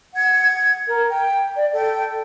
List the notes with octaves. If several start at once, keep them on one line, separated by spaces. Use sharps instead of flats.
F#5 G#6
A#4
G5
D5
A4 G5